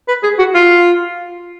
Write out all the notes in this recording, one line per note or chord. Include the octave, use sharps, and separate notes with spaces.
B4
G#4
F#4
F4